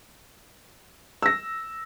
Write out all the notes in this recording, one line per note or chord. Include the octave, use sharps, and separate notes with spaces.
E6 A#6